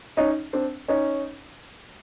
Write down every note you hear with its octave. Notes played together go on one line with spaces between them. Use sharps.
C#4 D#4
C4 D4
C#4 D#4